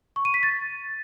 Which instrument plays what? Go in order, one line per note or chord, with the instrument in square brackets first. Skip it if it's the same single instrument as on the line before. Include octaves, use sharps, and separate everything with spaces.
[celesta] C#6
D#7
B6
A6